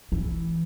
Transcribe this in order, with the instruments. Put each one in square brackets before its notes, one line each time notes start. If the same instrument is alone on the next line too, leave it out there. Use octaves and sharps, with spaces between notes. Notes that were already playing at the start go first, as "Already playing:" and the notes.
[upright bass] E3